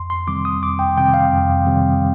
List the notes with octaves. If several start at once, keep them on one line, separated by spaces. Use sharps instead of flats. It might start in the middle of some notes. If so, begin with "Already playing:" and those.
Already playing: F2 C6
C6
C3 D#3 G3 C4 D6
D#6
F2 D6
G5
C3 D#3 G3 C4 G5
F5
F2
C3 D#3 G3 C4